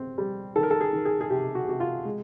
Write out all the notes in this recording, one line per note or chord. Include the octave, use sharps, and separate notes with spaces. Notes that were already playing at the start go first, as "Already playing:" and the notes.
Already playing: C4
G3
D#3 A4
A#4
A4
G#4
D#3
G#4
G#4
C3 G4
F#4
C3 F#4
F4
G#3